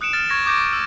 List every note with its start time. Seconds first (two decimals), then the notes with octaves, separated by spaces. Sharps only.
0.01 D#6 F#6 C#7 D7 E7
0.13 F6 A6 E7
0.30 C#6 G#6 A#6
0.46 C#6 D6 G6 A#6 D7
0.58 D7
0.73 E6 E7